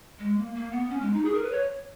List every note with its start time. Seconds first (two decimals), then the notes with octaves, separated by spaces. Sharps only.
0.19 G#3
0.37 A#3
0.55 A#3
0.71 B3
0.90 C#4
1.01 G#3
1.13 D#4
1.25 G#4
1.34 A#4
1.42 B4
1.51 C#5